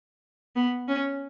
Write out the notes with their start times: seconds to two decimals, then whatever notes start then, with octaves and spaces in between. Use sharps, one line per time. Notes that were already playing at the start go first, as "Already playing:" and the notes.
0.56 B3
0.88 C#4